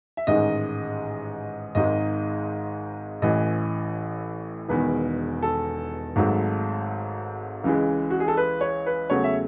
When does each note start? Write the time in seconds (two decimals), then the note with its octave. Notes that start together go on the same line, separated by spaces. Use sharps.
0.17 E5
0.27 A1 G#2 D#3 G#3 D#5
1.75 G#1 G#2 D#3 G#3 D#5
3.22 A1 A2 E3 D#5
4.69 E1 E2 D#3 B4
5.43 A4
6.16 G#1 G#2 F#3 A3
7.64 C#2 C#3 E3 G#3
8.10 F#4
8.20 G#4
8.28 A4
8.37 B4
8.61 C#5
8.86 B4
9.10 E2 C#3 F#3 A3 C#5
9.24 E5